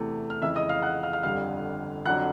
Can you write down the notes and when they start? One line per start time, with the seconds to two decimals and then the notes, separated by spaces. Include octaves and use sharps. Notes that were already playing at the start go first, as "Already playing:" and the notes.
Already playing: E2 C3 E3 A3
0.30 F6
0.42 F2 C#3 E3 G#3 E5 E6
0.56 D#5 D#6
0.69 F5 F6
0.82 F#5 F#6
1.03 F5 F6
1.13 F5 F6
1.23 G1 F2 D3 G3 F5 F6
2.05 F2 D3 F#3 F#5 F#6